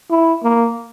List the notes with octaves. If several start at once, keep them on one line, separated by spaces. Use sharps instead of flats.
E4
A#3